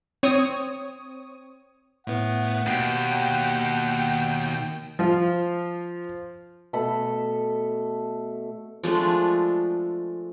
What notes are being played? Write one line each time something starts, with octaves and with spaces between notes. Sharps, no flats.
C4 C#5 D#6
A2 B3 F#5
D#2 B2 G5
F3 F4
B2 A3 A4 B5
F3 G#3 A3 D4